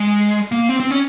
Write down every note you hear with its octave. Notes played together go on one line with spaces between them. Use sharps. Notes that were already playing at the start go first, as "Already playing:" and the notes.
Already playing: G#3
A#3
C4
C4
C#4